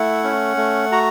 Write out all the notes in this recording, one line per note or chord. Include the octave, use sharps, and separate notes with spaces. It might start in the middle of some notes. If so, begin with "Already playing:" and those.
Already playing: A3 E4 F#5
C#4
A3
F#4 A#5